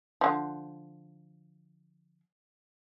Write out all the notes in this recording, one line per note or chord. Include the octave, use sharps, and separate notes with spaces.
D3 F3